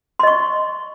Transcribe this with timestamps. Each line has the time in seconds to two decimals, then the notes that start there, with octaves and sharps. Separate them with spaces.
0.19 C6
0.23 D#5
0.27 C#6